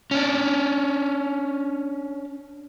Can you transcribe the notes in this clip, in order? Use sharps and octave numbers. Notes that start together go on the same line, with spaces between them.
C#4 D4